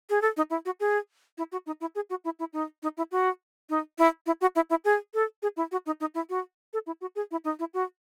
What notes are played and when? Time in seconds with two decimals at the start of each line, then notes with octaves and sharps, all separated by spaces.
0.10 G#4
0.22 A4
0.37 D#4
0.50 E4
0.65 F#4
0.80 G#4
1.38 E4
1.52 F#4
1.66 D#4
1.81 E4
1.95 G#4
2.10 F#4
2.25 E4
2.39 E4
2.53 D#4
2.83 D#4
2.97 E4
3.11 F#4
3.70 D#4
3.99 E4
4.26 E4
4.41 F#4
4.56 E4
4.70 E4
4.85 G#4
5.14 A4
5.42 G#4
5.57 E4
5.72 F#4
5.86 D#4
6.00 D#4
6.15 E4
6.30 F#4
6.73 A4
6.87 E4
7.01 F#4
7.16 G#4
7.31 E4
7.44 D#4
7.59 E4
7.74 F#4